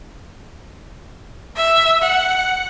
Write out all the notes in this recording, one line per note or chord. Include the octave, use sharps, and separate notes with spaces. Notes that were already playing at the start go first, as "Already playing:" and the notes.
E5
F#5